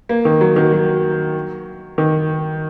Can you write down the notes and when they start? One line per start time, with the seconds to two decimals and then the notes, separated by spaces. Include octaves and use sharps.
0.09 A#3
0.25 D#3
0.41 F#3
0.56 D#3
0.73 F#3
1.98 D#3